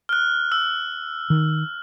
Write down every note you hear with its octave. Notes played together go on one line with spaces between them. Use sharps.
F6 F#6
E6
D#3